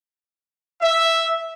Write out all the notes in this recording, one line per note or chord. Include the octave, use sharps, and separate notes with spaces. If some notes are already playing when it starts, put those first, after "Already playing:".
E5